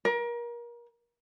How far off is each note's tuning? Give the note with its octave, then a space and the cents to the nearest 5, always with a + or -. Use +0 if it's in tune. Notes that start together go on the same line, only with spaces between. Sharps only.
A#4 +30